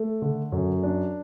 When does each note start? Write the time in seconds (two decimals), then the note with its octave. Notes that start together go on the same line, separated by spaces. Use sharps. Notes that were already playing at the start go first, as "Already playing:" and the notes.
Already playing: A3
0.22 D3
0.52 F#2
0.83 D4